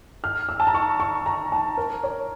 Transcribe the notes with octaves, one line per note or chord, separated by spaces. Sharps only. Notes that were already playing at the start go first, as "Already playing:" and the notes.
F6
E6
A5
A#5
C#6
C#6
A#5
A5
A#4
C#5